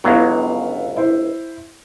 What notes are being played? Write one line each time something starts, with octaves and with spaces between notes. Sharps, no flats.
G1 C#2 F#3 B3 E4 F5
E4 C5